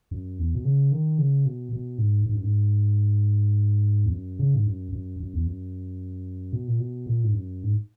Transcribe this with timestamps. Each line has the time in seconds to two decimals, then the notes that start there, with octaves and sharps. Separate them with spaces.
0.11 F#2
0.39 E2
0.55 B2
0.65 C#3
0.92 D#3
1.18 C#3
1.46 B2
1.73 B2
1.98 G#2
2.26 G#2
2.35 F#2
2.43 G#2
4.06 E2
4.12 F#2
4.39 C#3
4.55 G#2
4.67 F#2
4.92 F#2
5.20 F#2
5.34 E2
5.47 F#2
6.53 B2
6.68 A#2
6.80 B2
7.06 A#2
7.24 G#2
7.34 F#2
7.64 G#2